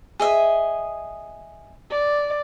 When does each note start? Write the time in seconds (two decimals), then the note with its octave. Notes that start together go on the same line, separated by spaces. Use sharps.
0.20 G#4 D#5 E5
1.91 D5